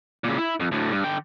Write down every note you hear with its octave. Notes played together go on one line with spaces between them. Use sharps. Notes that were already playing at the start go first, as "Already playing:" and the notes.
A#2 C#3
E4
F2
D2 A2
G2
D3 G5